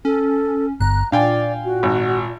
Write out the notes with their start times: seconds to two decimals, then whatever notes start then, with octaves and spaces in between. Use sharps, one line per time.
0.05 C#4 A4
0.80 G1 A#5 F#6
1.12 A#2 D4 D5 F5 G5 G#5
1.64 F#4
1.83 G#1